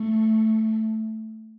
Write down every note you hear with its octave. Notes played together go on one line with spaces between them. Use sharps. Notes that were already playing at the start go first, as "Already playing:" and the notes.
Already playing: A3